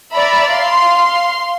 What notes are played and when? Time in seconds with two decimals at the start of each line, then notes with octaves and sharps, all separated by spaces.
0.12 D5 E5 A#5 B5
0.50 F5 C6